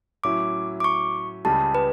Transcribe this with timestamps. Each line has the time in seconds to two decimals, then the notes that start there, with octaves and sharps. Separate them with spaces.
0.24 A2 F#3 C#4 E4 D6
0.80 D6
0.84 C#6
1.45 C#2 C#3 G3 A5
1.75 B4